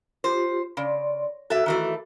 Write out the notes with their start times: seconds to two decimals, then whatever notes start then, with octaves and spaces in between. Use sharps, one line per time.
0.24 F4 G4 C5
0.77 C#3 D5 C6
1.50 F#4 A4 E5
1.66 D#3 E3 A3